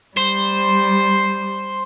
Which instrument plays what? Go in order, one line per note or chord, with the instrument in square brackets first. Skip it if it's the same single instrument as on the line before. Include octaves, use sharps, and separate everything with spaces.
[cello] G3 [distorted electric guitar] C5